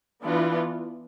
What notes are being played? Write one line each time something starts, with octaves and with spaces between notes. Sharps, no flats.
E3 B3 D4 F4